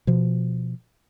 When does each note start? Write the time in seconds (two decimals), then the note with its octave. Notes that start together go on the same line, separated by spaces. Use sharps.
0.07 B2 F3